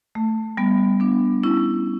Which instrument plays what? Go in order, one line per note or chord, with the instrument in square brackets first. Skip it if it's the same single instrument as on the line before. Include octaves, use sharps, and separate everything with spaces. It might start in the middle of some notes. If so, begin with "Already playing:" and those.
[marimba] A3
G3 B3
B3 D4
C#4 E4